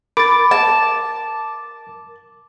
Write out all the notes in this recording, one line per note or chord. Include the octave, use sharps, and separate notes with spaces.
A#4 B5 D6 A6
A5